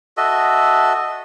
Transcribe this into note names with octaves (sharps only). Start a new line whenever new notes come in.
F#4 A4 D#5 E5